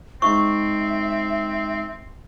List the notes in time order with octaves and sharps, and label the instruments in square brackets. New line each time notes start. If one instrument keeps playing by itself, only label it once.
[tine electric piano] G#3 D#4 C5 [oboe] C4 [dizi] E5 [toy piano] C#6